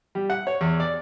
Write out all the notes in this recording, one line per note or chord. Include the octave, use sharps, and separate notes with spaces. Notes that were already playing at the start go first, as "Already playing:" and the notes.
G3
F#5
C#5
E2
D5